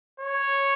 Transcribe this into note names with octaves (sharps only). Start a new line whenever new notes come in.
C#5